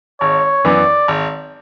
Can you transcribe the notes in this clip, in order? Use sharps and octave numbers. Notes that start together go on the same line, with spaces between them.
G#1 C#5
F#2 E3 B3 D5
G#1